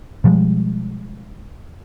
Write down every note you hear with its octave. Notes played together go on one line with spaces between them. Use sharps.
B2 F3 G3 G#3